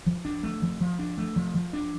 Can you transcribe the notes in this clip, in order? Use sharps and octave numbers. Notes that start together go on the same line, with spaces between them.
F3
D4
A3
F3
F3
D4
A3
F3
F3
D4